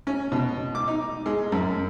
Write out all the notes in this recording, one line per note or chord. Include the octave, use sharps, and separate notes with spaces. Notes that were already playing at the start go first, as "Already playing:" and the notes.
C#4
B2
D6
D#4
G#3
F#2